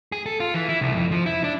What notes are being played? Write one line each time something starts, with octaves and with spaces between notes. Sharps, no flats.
G#4
A4
F4
E3
E4
C2
F2
F3
E4
D4